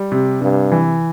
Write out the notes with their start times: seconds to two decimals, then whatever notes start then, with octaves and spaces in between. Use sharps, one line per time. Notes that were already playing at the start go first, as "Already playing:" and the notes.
Already playing: G3
0.12 C3
0.41 G2 C3
0.72 E3